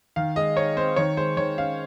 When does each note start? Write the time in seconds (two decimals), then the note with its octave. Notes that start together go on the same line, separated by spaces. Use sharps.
0.16 D#3 F5
0.36 G#3 D#5
0.56 D#4 C#5
0.77 C4 C5
0.96 D#3 C#5
1.17 G#3 C5
1.37 D#3 C#5
1.58 C#4 F5